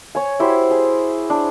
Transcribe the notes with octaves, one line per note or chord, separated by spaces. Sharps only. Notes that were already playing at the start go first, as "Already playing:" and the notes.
C#5 G#5
E4 F#4 G4 C5
G#4
D4